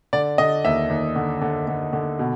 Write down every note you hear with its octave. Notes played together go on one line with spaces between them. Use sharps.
D3 D5
D3 D#5
D#2 E5
D#2
D3
D3
D3
D3
B2